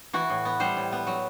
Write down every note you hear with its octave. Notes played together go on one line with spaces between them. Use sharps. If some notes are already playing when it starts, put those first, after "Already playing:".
E3 F#4
A2
B3
G3 C5
A2
B3
F#3